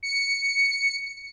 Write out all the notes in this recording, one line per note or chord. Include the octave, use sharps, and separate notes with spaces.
C#7